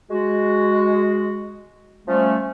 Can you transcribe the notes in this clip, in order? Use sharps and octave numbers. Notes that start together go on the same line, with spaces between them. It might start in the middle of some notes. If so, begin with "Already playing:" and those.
G#3 F#4
F3 G3 A3 C#4